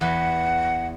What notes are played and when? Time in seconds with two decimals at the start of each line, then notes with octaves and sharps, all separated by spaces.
0.01 E2 B4 F#5